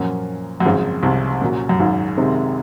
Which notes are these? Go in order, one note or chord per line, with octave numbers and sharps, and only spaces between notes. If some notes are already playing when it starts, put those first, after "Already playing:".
Already playing: F#2 A#2 F3 A#3 C#4
F#2
G#1 G#2 C#3 F3 G#3 C4
C2 C3
A#2 F#3 C#4 F#4
F#2
G#1 G#2
C3 D#3 G#3 C4